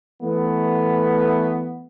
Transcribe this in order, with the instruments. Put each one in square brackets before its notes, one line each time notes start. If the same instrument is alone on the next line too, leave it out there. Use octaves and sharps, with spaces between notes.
[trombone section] E3 A3 B3